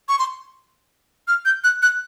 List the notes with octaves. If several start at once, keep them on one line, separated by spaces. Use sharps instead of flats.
C#6
C6
F6
G6
F#6
F#6